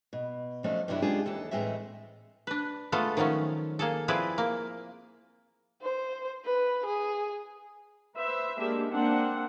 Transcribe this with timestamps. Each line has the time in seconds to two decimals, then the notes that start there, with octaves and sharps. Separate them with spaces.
0.13 B2
0.64 F3 F#3 A3 C#4 D4 D#5
0.88 G2 C3 F#3 A3 D4 E4
1.02 G#3 C#4 D4 F4 G4 G#4
1.26 D#2 E3 A4
1.51 A2 E3 G#3 A3 C4 E5
2.47 D4 B4
2.92 G#3 A3 B3 F4 A4
3.17 D#3 F3 F#3 A3 C#4
3.79 A#3 G#4 A4
4.08 F3 C4 E4 G#4 B4 D5
4.38 A#3
5.82 C5
6.45 B4
6.85 G#4
8.15 B4 C5 E5
8.58 G#3 A#3 D4 G4 E5
8.91 A#3 C4 D4 F#5